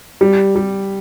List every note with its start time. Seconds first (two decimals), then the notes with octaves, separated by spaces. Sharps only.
0.21 G3
0.55 G3